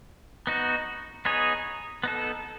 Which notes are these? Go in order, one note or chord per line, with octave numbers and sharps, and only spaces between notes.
B3 D#4 F#4
B3 D#4 G#4 C#5
B3 D#4 A4